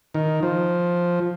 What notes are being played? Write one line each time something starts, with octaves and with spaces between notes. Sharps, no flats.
D#3
F3